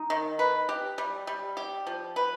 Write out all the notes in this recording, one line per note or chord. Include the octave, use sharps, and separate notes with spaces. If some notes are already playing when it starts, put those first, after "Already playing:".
Already playing: D#4
D#3
B4
G4
G3
G3
G4
F3
B4